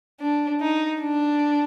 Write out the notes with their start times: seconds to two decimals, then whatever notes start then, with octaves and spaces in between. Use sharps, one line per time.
0.20 D4
0.61 D#4
1.01 D4